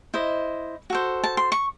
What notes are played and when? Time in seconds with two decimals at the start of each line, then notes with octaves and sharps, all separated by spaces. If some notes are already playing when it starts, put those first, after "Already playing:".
0.14 E4 C5 D#5
0.90 F#4 A4 C5
1.24 A5
1.37 C6
1.52 C#6